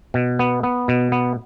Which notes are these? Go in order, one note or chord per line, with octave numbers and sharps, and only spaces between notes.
B2
B3
B3
B2
B3